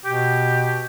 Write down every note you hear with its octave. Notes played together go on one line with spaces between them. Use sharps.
B2 G4